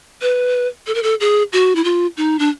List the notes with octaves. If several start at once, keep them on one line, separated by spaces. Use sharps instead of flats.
B4
A4
A#4
A4
G#4
F#4
E4
F4
D#4
D4